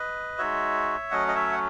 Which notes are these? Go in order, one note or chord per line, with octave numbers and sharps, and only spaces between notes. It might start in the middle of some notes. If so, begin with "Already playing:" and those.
Already playing: B4 D#5
G#3 D#4 F#4 C#5 E5
F#3 A3 C#4 D#5 F#5
D#5
C#5 E5
F#5